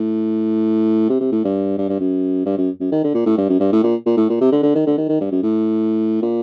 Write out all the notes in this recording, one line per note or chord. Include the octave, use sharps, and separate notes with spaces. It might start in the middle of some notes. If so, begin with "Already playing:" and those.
Already playing: A2
C3
C3
A2
G2
G2
G2
F#2
G2
F#2
F#2
D#3
D3
A#2
A2
G2
F#2
G2
A2
A#2
A#2
A2
A#2
C3
D3
D3
D#3
D3
D#3
D#3
G2
F#2
A2
A#2